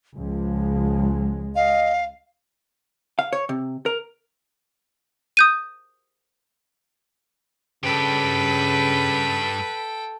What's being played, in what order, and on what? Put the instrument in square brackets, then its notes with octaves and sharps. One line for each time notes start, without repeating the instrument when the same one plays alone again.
[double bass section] C#2 G#3 [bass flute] F3
[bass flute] D#5 [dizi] F5
[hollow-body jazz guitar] F5
C#5
C3
A#4
[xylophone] D#6 G6 D#7
[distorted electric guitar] G2 G4 [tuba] C#3 [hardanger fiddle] A4 G5 [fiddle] B4